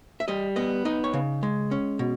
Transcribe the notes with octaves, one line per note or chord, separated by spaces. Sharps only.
E5
G3 D#5
B3 D#5
D#4 D#5
C#5
C#3
G#3
C#4
B2